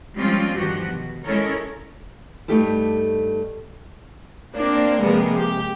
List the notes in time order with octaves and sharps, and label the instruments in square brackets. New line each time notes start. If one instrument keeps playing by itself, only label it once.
[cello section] F3 G3 G#3 C4 C#4 F4
E2 G2 D#3 F3 F#4 G4
B2
G#3 C#4 E4 A4 A#4 C#5
[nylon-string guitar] G2 A3 D#4 G4 A4 A5
[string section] A#3 C4 D4
C3 F3 G#3 A#3 B3
G4